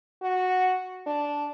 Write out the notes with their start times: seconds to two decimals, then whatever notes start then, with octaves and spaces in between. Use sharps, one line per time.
0.22 F#4
1.07 D4